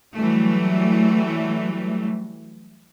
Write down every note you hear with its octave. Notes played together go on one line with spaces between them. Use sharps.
E3 F#3 G3 A3